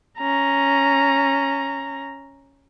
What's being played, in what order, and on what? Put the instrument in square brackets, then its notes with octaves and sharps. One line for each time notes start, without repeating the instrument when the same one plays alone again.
[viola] C#4 A#5